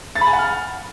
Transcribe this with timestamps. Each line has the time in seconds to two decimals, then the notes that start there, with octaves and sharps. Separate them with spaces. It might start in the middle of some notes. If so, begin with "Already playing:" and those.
0.16 A6
0.21 B5
0.27 G#5
0.33 F#5
0.39 F6